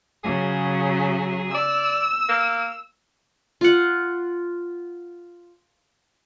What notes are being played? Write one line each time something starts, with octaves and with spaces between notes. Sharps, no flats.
C#3 F#3 G#4
D5 E6
A#3
F4 F#5